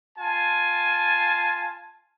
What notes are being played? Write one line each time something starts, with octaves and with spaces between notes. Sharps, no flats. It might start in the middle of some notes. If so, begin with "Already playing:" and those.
F4 G#5 A5